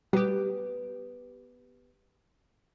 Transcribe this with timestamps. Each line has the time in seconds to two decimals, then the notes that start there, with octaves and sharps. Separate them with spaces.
0.13 G3 B3 G4